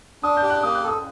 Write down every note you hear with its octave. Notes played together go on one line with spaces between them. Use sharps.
D4 D#6
G6
G4
F#6
A#3 D#6
F#6
A4 D#6